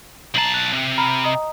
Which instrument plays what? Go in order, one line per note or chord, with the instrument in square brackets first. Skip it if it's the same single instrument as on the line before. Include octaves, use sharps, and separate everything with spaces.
[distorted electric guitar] B1 A5 [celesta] A#5 C7 F#7
[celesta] F#6
[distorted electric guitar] C3
[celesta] A#5 B5 F6
D#5 A#5 D#6